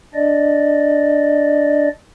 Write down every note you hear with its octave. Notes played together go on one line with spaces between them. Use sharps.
D4 D5 D#5